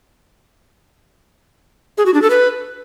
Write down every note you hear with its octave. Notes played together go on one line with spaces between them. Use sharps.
G#4
F#4
D4
A4
B4